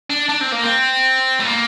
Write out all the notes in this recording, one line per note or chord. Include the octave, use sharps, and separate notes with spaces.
D4
D4
C4
A#3
C4
A3
A#3